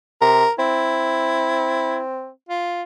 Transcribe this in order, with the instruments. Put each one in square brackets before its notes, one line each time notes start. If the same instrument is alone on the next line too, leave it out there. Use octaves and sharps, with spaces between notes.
[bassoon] C3 [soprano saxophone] A#4
[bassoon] C4 [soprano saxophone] E4
[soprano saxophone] F4